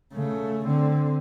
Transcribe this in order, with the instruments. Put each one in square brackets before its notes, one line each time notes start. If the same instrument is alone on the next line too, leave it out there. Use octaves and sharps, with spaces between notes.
[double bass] C#3 A3
D3 C4